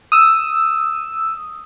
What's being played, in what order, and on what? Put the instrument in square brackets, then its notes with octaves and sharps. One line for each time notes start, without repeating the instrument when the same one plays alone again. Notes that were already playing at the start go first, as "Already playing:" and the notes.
[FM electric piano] D#6 E6